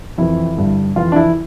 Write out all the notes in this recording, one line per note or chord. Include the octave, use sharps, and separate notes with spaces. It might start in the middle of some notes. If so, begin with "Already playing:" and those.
F2 C3 E3 E4
G2 D3
F2 C3 E3 F4
D4
E4